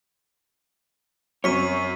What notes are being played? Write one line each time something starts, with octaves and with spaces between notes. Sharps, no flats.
F#2 F#3 C4 C#5 C#6 B6 D#7